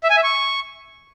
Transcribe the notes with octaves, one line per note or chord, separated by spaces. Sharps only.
E5
G#5
E5
C#6